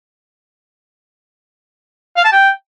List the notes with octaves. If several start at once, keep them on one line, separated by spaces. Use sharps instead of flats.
F5
A5
G5